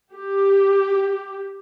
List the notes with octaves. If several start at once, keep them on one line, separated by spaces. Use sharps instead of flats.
G4